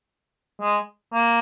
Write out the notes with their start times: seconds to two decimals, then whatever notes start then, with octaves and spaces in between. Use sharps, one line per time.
0.61 G#3
1.13 A#3